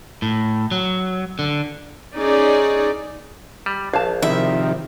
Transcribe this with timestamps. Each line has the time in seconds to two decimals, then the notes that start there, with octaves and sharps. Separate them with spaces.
0.22 A2
0.71 F#3
1.39 D3
2.15 C#4 D#4 G#4 D5
3.66 G3
3.93 A#1 F5 A5
4.22 C3 D#3 F3 E4 E5